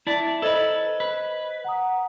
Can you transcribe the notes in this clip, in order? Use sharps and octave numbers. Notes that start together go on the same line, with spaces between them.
E4 D5 A5
A4 B4 C5 D#5 G#6
B4
F#5 A#5 D#6